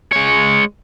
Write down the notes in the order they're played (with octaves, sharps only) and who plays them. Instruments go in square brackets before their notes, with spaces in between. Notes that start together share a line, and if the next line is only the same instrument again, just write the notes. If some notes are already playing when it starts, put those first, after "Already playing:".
[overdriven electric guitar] G#3 C#5